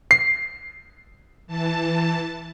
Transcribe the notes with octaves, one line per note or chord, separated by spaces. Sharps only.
C7
E3 A5